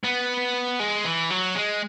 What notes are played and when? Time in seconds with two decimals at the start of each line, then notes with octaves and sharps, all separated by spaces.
0.04 B3
0.80 G#3
1.05 E3
1.30 F#3
1.55 G#3